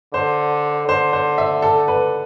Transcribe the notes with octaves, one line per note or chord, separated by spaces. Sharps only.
D3 C5
D3 C5
C5
E5
A4
B4